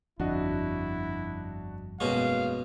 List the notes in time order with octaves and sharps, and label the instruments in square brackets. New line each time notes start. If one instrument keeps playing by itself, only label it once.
[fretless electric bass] G1 F2 [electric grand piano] D4 F#4 D#5 [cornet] E4
[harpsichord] B2 C#4 [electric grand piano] G#3 A#3 [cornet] F5